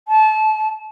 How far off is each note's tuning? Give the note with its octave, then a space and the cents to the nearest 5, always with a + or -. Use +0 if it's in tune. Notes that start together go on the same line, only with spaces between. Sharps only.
A5 -30